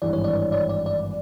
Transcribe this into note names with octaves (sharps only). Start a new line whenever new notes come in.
G#1 G2 E3 G3 D5
C#5
D5
D5
D5
D5
D5